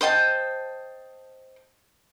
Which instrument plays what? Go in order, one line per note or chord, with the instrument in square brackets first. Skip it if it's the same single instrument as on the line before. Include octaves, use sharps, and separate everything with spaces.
[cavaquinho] C5 D#5 G5 A5